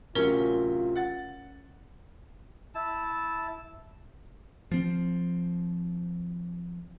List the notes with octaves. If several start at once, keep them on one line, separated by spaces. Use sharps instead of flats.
D1 C3 F#3 C#4 F4 A#4
F#5 A6
E4 A5
F3 C4